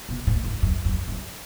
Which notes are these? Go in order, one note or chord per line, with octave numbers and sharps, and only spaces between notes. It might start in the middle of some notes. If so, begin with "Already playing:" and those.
B2
A2
G#2
F#2
F#2
F#2